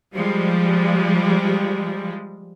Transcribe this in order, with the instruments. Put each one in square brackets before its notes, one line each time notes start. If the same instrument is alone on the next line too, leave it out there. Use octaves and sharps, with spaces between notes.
[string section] F3 G3 G#3